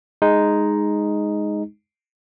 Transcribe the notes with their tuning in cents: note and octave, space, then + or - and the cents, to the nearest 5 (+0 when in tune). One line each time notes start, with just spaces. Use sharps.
G#3 +0 D#4 +0